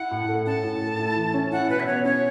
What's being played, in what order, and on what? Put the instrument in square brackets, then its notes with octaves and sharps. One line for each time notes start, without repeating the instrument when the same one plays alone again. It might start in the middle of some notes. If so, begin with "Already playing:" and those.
Already playing: [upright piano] E4 [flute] F#5
[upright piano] A2
A3
[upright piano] C#4 [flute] A5
[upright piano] A2
A3
E4
E3
C#4
[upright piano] E4 [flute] F#5
[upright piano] B2 [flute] B4
[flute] E5
[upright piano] B3 [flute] C#5
[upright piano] C#4 [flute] C#5